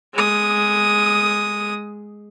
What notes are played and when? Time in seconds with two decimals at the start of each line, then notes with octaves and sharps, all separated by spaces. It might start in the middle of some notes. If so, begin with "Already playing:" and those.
0.14 G#3 D#6